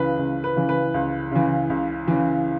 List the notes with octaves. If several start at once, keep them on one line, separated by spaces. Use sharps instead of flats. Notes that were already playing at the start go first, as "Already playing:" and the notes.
Already playing: C#2 C#3 E3 B4
C#2
B4
C#3 E3
B4
C#2
C#3 E3
C#2
C#3 E3